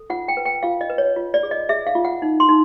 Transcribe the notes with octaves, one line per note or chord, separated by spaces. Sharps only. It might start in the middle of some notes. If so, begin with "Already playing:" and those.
Already playing: A4
F4 F#5
G5
B4
G5
F4 F5
D#5
B4
C#5
F4
D5
G#4
D#5
G#4 E5
F5
F4
F#5
D#4
C6
D#4